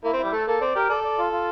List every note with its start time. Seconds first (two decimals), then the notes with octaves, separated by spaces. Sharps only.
0.04 A#3 E4
0.13 C4
0.18 E4
0.24 G3
0.32 A3 A4
0.47 A#3 A4
0.61 C4 D5
0.76 G4 A#4
0.89 A4 D5
1.04 D5
1.18 F4
1.32 F4